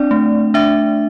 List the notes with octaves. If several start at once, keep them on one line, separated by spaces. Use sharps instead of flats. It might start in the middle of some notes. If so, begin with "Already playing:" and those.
Already playing: C4 D4 D5
A3
D4 E5